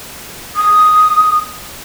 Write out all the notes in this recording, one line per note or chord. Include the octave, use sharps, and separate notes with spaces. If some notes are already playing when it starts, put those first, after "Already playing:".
D#6